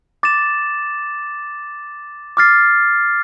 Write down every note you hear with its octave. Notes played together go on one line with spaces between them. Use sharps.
D6 A6 E7
D6 F6 A6 C7